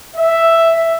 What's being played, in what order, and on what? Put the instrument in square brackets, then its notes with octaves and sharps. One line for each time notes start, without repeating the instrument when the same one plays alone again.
[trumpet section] E5